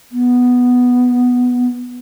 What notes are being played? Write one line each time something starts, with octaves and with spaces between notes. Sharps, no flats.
B3